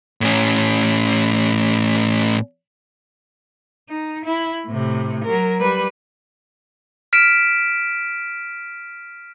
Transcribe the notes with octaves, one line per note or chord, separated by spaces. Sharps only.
A2 C#4
D#4
E4
A2 C3
F#3 A#4
G3 B4
F6 B6 D7 E7